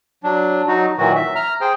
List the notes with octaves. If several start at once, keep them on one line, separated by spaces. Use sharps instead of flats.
F#3 D4
F#3 D#4 F#4
A#2 D#3 E3 F#3 F#4
E5
A#5 F6
G#4 C5 G5